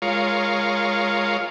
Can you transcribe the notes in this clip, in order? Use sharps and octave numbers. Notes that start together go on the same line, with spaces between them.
G#3 F4 A#4 C#5 F5